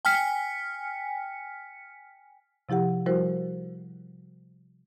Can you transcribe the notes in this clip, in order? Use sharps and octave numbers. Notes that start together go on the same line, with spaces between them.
G5 G#5 F6 B6 C#7
C3 F3 E4 G4 F#5
F3 G3 E4 F#4 A#4 C5